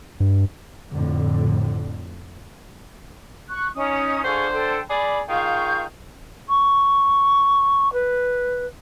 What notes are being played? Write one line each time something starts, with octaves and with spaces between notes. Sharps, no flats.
G2
F2 A2 D3
C#6 F#6
C#4 D#4 D#6
D3 F4 G#4 C5 C#6
A4 G5
G#4 D5 B5
D#3 F4 G#4 F5 C#6 G6
C#6
B4